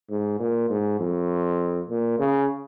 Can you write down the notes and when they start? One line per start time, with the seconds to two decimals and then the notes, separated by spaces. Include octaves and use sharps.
0.10 G#2
0.40 A#2
0.70 G#2
1.00 F2
1.90 A#2
2.19 C#3